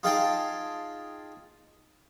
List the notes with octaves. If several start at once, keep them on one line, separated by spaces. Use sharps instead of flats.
D#4 F4 G#4 F5 G5 A5